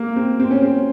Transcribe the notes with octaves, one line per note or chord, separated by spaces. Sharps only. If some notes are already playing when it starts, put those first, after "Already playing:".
Already playing: A#3
C4
C4
C#4
C4